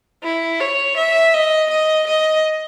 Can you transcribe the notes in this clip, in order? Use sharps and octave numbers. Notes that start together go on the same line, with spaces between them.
E4
C#5
E5
D#5
D#5
D#5